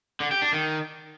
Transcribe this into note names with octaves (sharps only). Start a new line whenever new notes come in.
D3
G4
D4
D#3